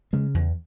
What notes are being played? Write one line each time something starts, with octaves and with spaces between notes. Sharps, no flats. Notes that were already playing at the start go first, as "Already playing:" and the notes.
C#3 G#3
E2